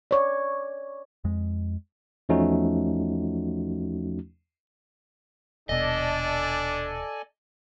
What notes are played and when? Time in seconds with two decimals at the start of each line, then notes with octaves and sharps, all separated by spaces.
0.11 C#5 D5
1.24 F2 G#3
2.29 E2 F3 A3 C#4 D#4 F#4
5.69 D#1 B2 D4 A4 D5 D#5 G#5